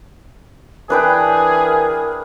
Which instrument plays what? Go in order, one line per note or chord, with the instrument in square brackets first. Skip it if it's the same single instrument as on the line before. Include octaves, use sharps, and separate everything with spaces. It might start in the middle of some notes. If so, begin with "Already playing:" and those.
[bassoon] E3 [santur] D4 B4 G5 [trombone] G#4 [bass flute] A#4